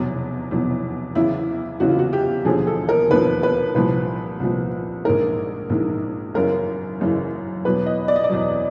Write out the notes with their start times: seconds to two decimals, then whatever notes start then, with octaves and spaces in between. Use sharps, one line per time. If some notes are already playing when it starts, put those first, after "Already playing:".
Already playing: F1 E2 B2 F#3
0.51 F1 E2 B2 F#3
1.15 F#1 E2 C#3 E3 E4
1.80 F#1 E2 C#3 E3 F#4
1.89 F4
1.99 F#4
2.13 G4
2.45 E1 D#2 D3 F3 G#4
2.67 A4
2.89 A#4
3.10 E1 D#2 D3 F3 B4
3.43 B4
3.75 C2 A#2 F3 B4
4.40 C2 A#2 F3
5.05 A#1 G#2 E3 A#4
5.70 A#1 G#2 E3
6.34 F#1 F#2 C#3 E3 A#4
7.00 F#1 F#2 C#3 E3
7.65 E2 B2 F#3 B4
7.86 D#5
8.08 D5
8.16 D#5
8.24 D5
8.29 E2 B2 F#3